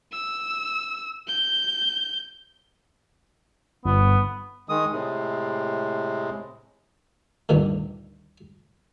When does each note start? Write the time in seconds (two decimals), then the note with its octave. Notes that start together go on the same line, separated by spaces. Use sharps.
0.12 E6
1.28 G6
3.85 G1 B3
4.69 D#3 G#3 D#6
4.92 A2 C3 G#3
7.49 D2 G2 A#2 D3 D#3